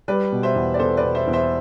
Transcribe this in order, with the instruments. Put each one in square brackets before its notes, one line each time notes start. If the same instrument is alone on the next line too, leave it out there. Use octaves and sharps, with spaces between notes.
[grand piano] G3 [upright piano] B4 D5
[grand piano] B2
[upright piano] C5 E5
[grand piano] E2
[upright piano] D5
[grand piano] E2 [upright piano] A4 C5
[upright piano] B4 D5
[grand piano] B2
[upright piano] C5 E5
[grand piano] E2
[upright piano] C5 E5